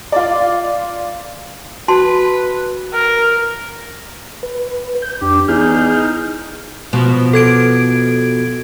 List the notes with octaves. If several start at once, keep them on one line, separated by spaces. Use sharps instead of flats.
F4 D5
F#4 B4 A5 C6
A#4
B4
G6
F2 D4 G4
E2 D#4 G#4 F6 G6
B2 F3
A4 G#6 D7